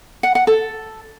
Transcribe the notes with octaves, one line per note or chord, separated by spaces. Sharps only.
F#5
F#5
A4